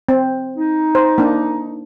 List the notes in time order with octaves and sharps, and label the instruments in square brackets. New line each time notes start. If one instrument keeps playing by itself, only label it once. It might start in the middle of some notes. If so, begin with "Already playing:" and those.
[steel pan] C4
[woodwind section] D#4
[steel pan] C5
A#3 D4